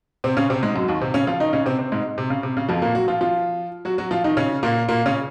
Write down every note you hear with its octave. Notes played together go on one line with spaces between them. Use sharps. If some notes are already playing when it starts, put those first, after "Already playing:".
C3 C4
C#3 C#4
C3 C4
G#2 G#3
F#2 F#3
D#2 D#3
C3 C4
C#3 C#4
F3 F4
D#3 D#4
C#3 C#4
C3 C4
C3 C4
G#2 G#3
C3
C#3
C3
C#3
F2 F3
A#2 A#3
F#3 F#4
F3 F4
F3 F4
F#3 F#4
F#3 F#4
F3 F4
D#3 D#4
C#3 C#4
A#2 A#3
A#2 A#3
C#3 C#4